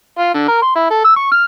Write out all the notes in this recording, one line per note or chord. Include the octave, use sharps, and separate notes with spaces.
F4
D3
A#4
C6
E4
A4
E6
C#6
F6